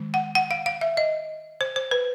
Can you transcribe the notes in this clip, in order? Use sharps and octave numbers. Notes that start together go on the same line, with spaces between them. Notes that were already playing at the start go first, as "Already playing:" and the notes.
Already playing: D#3 G#3
F#5
F#5
F5
F5
E5
D#5
C5
C5
B4